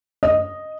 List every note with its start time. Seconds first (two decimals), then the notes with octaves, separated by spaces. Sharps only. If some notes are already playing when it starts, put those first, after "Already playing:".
0.23 D#5